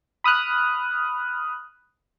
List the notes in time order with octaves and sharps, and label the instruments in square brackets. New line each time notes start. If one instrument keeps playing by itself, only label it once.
[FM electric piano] B5 D#6 F6 F#6